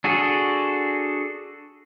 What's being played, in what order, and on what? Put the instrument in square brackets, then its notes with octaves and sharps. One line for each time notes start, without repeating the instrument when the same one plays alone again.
[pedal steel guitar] D4 F#4 G#4 A4